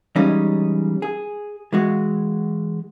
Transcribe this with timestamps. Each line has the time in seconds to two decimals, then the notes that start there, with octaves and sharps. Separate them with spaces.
0.16 E3 G3 G#3 C#4 D#4
1.02 G#4
1.73 E3 G#3 F#4